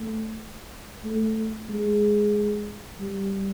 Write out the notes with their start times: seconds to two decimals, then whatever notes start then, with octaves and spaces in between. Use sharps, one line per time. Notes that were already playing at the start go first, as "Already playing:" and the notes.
Already playing: A3
1.04 A3
1.69 G#3
3.00 G3